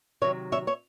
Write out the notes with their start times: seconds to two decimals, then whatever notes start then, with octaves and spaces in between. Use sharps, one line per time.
0.21 C3 D#3 F#3 C#5 E5
0.52 C#5 E5
0.67 C#5 E5